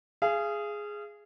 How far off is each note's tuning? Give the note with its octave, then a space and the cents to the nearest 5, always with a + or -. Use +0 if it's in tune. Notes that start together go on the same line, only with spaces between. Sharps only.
G#4 +0 F5 -35